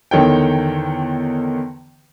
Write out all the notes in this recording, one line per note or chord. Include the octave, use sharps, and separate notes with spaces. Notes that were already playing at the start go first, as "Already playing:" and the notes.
E2 D3 D#3 C#5 G5